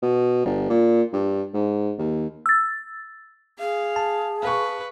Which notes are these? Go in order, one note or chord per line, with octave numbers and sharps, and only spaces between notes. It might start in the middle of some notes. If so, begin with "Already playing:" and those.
B2
G1
A#2
G2
G#2
D#2
E6 A6
G#4 F5
A5
B4 F5 C#6